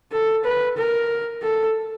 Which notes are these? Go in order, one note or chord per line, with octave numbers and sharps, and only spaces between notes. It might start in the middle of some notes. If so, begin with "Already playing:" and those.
A4
B4
A#4
A4